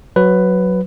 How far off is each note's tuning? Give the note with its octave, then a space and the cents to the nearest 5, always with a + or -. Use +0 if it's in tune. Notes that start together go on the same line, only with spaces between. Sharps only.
F#3 +0 B4 +10